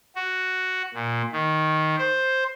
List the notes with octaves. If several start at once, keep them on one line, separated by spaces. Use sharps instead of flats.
F#4
A#2
D#3
C5